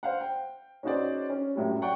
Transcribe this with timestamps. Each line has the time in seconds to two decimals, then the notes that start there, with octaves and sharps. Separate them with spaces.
0.03 C5 F5 F#5
0.21 G5
0.83 C#4 D#4 F#4 G#4 C5 D5
1.30 C#4
1.55 F#2 A2 G3
1.82 D5 F#5 G5 C#6